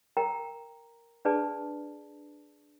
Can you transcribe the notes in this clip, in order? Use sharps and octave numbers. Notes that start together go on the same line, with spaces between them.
A#4 G5 A#5
D4 G#4 B4 D5 A5